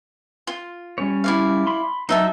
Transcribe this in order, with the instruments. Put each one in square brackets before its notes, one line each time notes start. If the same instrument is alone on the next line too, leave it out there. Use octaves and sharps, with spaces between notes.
[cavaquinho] F4
[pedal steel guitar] G3 C#4 C#5
[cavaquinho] E4 D5 F5
[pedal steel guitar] B5 C6
[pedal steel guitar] F#3 [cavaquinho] D#4 E5 A5